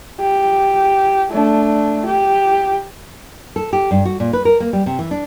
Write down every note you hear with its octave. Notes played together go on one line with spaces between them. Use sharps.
G4
A3 D4
G4
A4
G4
G2
F#4
A#2
B4
A#4
A#3
G3
C3
E3
D4